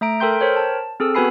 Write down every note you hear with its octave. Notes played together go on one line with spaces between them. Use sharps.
A3 E5 A#5 D7
A4 A#4 G5 C6 G6
A#4 C5 C#5 G5
A5
C4 G#4 A4 E6
B3 F#4 B4 G#5 B5 C7